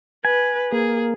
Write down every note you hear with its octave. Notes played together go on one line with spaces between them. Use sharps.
B4 G#5
A#3 G#4